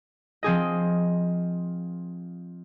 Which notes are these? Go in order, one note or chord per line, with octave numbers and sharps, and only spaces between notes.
F3 C4 G#4 D#5